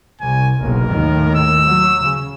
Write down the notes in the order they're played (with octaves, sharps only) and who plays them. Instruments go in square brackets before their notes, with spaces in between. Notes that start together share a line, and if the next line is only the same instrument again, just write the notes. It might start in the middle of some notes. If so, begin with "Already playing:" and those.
[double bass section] C2 [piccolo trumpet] G#5
[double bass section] F#1 B1 [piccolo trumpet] A#4
[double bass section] D#2 A2 D#3
[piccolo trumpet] E6
[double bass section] F#3
C#3